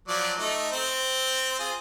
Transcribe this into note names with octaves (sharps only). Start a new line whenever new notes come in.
F3 F#3 D5
A3 D#4
C4 C5
F4 G#4